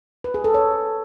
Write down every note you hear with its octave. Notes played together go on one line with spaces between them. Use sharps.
B4
G#4
A4
C#5